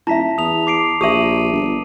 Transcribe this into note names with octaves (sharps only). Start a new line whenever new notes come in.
D#1 E4 E5 A5 A#5 B6
E2 D#6 F7
D6 C7 D7
A#1 G4 E5 D#6 D#7 F#7
G1